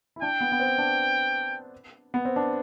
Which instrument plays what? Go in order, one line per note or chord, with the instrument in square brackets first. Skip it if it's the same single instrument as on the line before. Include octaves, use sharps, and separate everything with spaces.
[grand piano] E4
[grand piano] D4 [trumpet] G5
[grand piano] B3
B3
C4
D4
B3
C4
D4